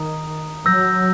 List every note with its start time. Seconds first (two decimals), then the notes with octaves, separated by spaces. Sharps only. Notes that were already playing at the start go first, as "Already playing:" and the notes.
Already playing: D#3 A#5 D#6
0.66 F#3 E6 G6 A#6